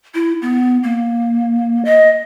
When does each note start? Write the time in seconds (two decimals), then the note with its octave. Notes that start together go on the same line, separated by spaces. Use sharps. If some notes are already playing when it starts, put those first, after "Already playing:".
0.15 E4
0.42 B3
0.83 A#3
1.85 D#5